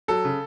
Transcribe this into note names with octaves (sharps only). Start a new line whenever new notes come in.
F#3 A4
C#3